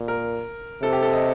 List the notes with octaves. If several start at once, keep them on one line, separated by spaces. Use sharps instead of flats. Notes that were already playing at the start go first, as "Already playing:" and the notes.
Already playing: A#2
A#4
C3 A4
G4
A4
D#5